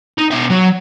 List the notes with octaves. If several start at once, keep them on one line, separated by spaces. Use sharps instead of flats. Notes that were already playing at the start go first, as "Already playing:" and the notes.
D#4
B2 E5
F#3